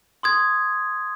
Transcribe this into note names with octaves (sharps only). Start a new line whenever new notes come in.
C6 D#6 G#6